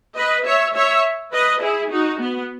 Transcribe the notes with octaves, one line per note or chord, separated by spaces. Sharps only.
B4 D#5
C#5 E5
C#5 E5
B4 D#5
E4 G#4
D#4 F#4
B3